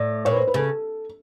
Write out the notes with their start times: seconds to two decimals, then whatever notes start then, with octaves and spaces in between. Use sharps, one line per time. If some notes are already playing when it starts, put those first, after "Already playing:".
Already playing: A2 D5
0.25 A#2 C#5
0.31 B4
0.36 C5
0.47 B4
0.54 C#3 A4